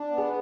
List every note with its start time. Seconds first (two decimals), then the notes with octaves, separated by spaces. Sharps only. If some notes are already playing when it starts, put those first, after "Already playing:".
Already playing: D4
0.10 B3
0.18 G#4